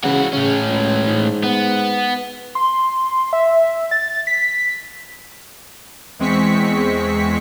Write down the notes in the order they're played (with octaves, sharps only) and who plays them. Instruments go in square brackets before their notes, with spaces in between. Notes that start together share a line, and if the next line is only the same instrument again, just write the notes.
[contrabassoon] C#3 [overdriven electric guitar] E3 F#4
[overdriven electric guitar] A2 C#4 [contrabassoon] C#3
[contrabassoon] C#2
G#2
[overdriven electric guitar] B3
[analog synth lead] C6
E5
A6
B6
[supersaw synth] E2 G#3 C4 C#6 B6 C#7